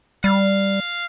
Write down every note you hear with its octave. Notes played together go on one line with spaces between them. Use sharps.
G3 F5